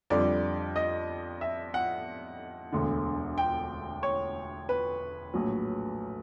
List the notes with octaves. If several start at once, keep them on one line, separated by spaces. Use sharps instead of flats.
F2 D3 G3 D5
D#5
E5
F#5
E1 D2 D3
G5
C#5
B4
A#1 A2 F#3